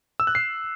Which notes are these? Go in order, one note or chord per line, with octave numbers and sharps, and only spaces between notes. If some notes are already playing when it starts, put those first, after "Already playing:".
E6
F#6
C7